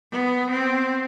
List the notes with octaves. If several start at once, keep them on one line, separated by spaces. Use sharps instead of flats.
B3
C4